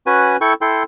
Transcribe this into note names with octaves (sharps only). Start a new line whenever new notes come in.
C#4 F#4 B4 G#5
E4 A4 G5 C#6
E4 A4 G5 C6